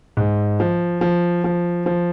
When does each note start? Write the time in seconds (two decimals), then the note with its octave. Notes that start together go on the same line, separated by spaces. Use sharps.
0.17 G#2
0.60 F3
1.01 F3
1.44 F3
1.86 F3